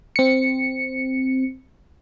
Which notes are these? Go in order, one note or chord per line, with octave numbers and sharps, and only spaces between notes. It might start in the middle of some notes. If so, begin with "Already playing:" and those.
C4 C#7